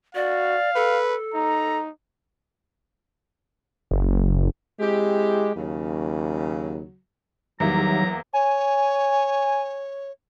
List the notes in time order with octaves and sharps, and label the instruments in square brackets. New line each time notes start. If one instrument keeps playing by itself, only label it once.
[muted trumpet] F#4 [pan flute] D5 [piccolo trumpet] F5
[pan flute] A4 [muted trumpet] B4
[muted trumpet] D#4 [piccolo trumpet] A#5
[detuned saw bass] F#1
[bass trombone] G#3 [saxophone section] C4 E4 G4
[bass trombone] D#2 [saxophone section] C#3 F#3
[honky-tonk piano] E2 A#3 E5 [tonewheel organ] D#3 G3 [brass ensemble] F#3 [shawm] A#5
[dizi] C#5 [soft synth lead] G#5